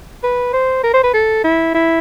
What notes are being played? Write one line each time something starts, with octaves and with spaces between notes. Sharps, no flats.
B4
C5
A#4
C5
B4
A4
E4
E4